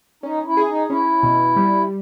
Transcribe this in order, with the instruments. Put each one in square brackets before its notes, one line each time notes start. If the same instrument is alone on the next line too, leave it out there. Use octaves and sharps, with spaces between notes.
[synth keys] C#4 [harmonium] D#4
[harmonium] E4
[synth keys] G#4
[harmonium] D#4
[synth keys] C#4 [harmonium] E4
[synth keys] B2
G3